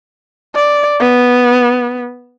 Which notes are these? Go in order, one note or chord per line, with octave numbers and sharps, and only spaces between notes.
D5
B3